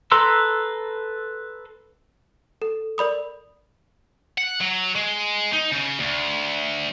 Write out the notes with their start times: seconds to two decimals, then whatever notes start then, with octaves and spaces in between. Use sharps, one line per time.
0.12 A4 B4 A#5 C6 E6
2.62 A4
2.98 A#4 D5 B5 D#6
4.38 F#5
4.61 F#3
4.96 G#3
5.53 D#4
5.72 C#3
6.00 D2